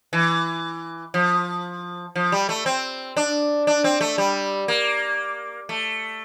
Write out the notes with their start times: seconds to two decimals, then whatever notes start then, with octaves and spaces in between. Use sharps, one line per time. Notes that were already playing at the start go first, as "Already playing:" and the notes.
0.13 E3
1.14 F3
2.16 F3
2.32 G3
2.49 A3
2.66 C4
3.17 D4
3.67 D4
3.84 C4
4.01 A3
4.18 G3
4.68 A#3
5.69 A3